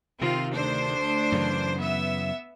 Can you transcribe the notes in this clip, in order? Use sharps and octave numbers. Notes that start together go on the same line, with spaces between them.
C3 D#3 C4 F4
D2 D4 C5
F#2 C#3 E3
B3 E5